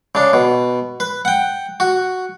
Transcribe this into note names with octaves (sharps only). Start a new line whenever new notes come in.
C#3 D4
B2
B4
F#5 G5
F#4